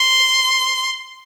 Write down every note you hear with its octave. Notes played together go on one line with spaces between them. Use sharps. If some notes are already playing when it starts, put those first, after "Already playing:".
Already playing: C6